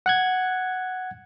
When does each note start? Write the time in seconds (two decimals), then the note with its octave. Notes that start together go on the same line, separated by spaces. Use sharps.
0.06 F#5 F#6 G#6